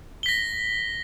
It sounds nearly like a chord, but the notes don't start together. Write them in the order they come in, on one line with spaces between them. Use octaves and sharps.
G7 B6 A#6